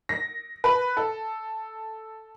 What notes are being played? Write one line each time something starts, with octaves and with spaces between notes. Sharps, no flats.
A#6
B4
A4